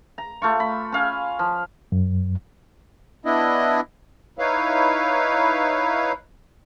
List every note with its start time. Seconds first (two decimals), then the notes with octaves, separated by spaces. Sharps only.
0.18 A#5
0.42 A3 F4 C#6
0.60 B5
0.92 C#4 F5 G#5
1.39 F3
1.92 F#2
3.25 B3 D4 E4 D#5
4.39 D#4 E4 B4 C#5 F5